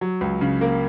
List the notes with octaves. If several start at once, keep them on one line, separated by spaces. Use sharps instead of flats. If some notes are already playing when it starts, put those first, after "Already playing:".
F#3
C#2
C#3
A#3